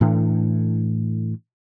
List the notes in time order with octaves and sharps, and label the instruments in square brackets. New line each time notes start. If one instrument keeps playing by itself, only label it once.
[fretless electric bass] A2 E3 D4